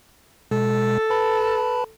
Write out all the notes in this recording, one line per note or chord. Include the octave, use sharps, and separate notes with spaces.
B2 G#3 A4
B4 A5 B5